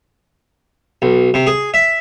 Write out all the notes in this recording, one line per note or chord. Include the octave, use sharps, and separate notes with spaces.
B1
C3
G#4
E5